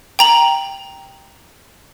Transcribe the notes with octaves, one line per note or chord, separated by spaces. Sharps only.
G5 A#5 F#7